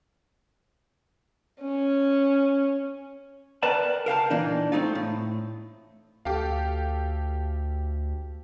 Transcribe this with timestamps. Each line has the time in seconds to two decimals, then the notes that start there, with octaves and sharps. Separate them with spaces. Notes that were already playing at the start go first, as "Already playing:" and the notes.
1.61 C#4
3.63 A#4 B4 D5 G5 A5 A#5
4.06 A#4 F5 G5 A5
4.30 A#2 E3 D4 D#4
4.72 A3 C4 D#4 F4
4.95 A2
6.25 D2 G4 A4 F5